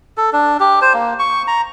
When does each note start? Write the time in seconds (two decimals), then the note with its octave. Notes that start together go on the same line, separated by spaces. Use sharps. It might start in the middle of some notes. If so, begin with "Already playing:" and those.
0.17 A4
0.33 D4
0.60 G4
0.82 C5
0.94 A#3
1.19 C#6
1.47 A#5